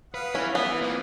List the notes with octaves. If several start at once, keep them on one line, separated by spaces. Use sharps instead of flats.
B4 F5 F#5 D#6
C#4 E4 B4
B3 E4 B4 F5
E3 F3 A#3 C4